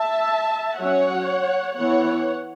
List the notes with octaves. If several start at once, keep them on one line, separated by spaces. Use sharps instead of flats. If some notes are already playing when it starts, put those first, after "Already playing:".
Already playing: E5 A5
F#3 C#4 C#5 F#5
E3 B3 C#5 F#5